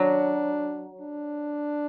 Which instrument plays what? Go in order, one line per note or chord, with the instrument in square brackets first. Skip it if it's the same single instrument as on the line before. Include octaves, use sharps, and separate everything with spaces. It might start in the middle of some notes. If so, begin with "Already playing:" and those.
Already playing: [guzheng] F#3 [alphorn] D4
[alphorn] D4